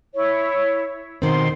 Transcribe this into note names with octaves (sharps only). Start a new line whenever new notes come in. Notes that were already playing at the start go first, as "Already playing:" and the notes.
E4 C#5
B2 D#3 C4 C6